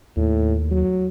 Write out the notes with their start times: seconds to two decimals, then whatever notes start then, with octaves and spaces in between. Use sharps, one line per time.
0.17 D#2 A2
0.71 F#3